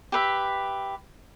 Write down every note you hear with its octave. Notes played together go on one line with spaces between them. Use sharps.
G4 B4 E5